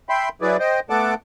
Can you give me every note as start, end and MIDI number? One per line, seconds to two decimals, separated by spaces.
0.09 0.29 76
0.09 0.29 79
0.09 0.29 83
0.09 0.29 84
0.42 0.57 54
0.42 0.57 64
0.42 0.57 68
0.42 0.57 71
0.42 0.57 74
0.60 0.80 72
0.60 0.80 75
0.60 0.80 79
0.90 1.14 57
0.90 1.14 59
0.90 1.14 69
0.90 1.14 78
0.90 1.14 81
0.90 1.14 86